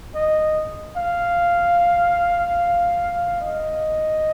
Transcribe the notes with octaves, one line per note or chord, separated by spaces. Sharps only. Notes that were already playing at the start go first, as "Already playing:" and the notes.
D#5
F5
D#5